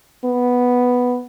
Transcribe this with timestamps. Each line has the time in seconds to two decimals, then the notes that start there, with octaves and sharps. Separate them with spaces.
0.25 B3